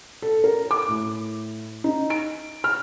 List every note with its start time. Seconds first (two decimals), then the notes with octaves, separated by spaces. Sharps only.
0.22 A4
0.44 A#4
0.71 D6
0.88 A2
1.84 D#4
2.10 D7
2.64 F6